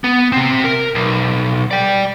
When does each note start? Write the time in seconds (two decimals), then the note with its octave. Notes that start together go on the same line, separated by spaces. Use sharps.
0.04 B3
0.32 C3 C4
0.64 A#4
0.95 B1
1.71 D5 G5